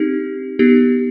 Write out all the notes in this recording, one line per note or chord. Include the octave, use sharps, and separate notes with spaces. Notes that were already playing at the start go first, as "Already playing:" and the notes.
Already playing: C4 D#4 G4
B3 D#4 G4